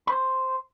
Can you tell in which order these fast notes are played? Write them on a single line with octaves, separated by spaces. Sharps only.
B5 C5 C6